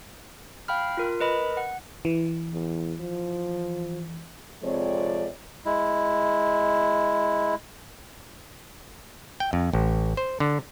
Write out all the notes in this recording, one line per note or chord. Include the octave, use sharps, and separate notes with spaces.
F5 G5 B5 F6
F4 A#4
A#4 B4 D#5 B5
F#5
E3
E2
F3
F2 C3 F3 G#3 C#5 D5
G#3 E4
G5
F2
A1
C5
D3